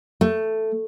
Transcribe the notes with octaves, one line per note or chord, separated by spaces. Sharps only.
A3